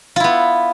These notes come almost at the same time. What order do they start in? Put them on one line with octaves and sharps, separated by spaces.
F4 E4 B3